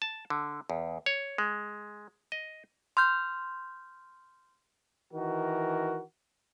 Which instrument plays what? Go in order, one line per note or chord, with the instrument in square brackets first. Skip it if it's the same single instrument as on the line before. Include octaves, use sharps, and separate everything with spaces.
[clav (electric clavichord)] A5
D3
E2
C#5
G#3
D#5
[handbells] C6 F6 G6
[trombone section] D#3 E3 F#4 A#4